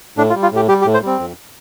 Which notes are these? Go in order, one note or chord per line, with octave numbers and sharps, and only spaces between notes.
A2 D4
F4
G3
F4
A2 G4
G3 G4
G4
A2
C5
G3 C4
F2